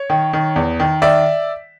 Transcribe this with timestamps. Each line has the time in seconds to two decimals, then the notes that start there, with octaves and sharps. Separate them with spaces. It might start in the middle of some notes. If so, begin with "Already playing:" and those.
Already playing: C#5
0.10 D#3
0.33 D#3
0.56 E2
0.80 D#3
1.02 D#3 D5 E5